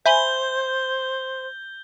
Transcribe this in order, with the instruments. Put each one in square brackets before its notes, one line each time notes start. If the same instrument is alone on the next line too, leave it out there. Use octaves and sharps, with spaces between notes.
[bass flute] C5 [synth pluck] E5 G#5 B5 [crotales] G6 G7